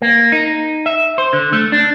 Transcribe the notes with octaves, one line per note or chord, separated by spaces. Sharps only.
A#3
D#4
E5
C5
D3
A3
D4